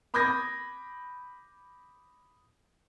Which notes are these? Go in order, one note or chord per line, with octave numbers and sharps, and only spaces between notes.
B5 D6 D#6 G6 G#6 A#6